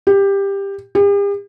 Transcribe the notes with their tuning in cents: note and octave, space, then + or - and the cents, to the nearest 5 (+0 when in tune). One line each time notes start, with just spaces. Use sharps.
G4 +15
G4 +45